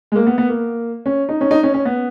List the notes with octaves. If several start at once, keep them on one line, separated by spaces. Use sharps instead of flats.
G#3
A#3
B3
B3
A#3
C#4
D#4
C#4
D#4
C#4
C#4
B3